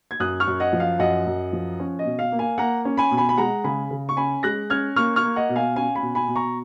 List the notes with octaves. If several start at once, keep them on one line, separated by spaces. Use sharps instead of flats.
G#6
F#2 D#6 F#6
C#6 F6
F#2
D#5 F#5
F3
F5
F#2 D#5 F#5
F#2
F3
C#4
D#5
B2
F5
A#3
F5 G#5
A#3 F#5 A#5
C#4
G#5 B5
B2
G#5 B5
B5
G#3 F#5 A#5
C#3 G#5 B5
C#3
C#6
C#4 G#5 B5
G#3 F#6 A#6
C#4 F6 G#6
A#3 C#6 F6
C#6 F6
A#3
D#5 F#5
B2
F5 G#5
C#4 F5 G#5
G#5 B5
B2
G#5 B5
B2
A#5 C#6